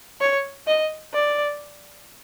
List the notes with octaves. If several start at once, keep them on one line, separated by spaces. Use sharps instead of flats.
C#5
D#5
D5